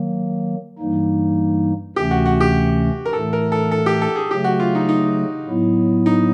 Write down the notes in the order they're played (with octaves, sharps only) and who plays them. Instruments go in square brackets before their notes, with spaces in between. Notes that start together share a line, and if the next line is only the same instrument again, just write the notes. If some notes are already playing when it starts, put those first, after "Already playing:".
Already playing: [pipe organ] D#3 F#3 A#3
G2 E3 G3 A#3 D#4
[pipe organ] D2 C3 E3 A3 C#4 [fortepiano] G4
[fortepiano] F#4
F#4
G4
A#4
[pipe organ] A2 E3 A3 [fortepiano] A4
[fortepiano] A#4
A4
A4
G4
A4
G#4
[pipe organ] C#3 F#3 A3 [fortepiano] G4
[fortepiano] F#4
F4
D#4
D#4
[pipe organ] A2 F#3 B3 E4
[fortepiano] D#4